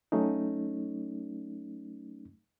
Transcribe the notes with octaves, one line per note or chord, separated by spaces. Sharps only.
F#3 A3 C#4 D#4